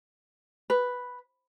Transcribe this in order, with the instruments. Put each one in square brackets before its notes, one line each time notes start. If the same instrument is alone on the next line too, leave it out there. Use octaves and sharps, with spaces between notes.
[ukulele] B4